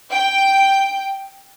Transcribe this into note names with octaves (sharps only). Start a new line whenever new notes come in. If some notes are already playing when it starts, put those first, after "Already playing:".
G5